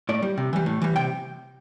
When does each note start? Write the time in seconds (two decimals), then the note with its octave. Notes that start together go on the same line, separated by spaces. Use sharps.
0.09 A2 D5
0.22 G3
0.38 C3
0.53 E3 G3
0.66 A2
0.82 E3 G3
0.96 C3 G5